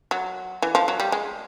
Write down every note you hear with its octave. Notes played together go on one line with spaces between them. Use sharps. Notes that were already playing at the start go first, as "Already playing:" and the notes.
F#3
E3
F3
F#3
G3
G#3